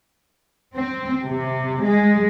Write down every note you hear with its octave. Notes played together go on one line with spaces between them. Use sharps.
C4
C3
G#3